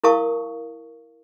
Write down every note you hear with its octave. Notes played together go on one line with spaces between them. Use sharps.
E4 A#4 F5 A5 C#6 D#6